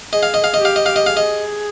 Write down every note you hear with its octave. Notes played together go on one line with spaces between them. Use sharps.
G#4 D#5
F5
D#5
F5
G4 D#5
F5
D#5
F5
D#5
G#4 F5
D#5